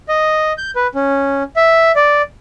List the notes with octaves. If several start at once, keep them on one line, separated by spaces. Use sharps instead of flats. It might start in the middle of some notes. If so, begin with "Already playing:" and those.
D#5
G6
B4
C#4
E5
D5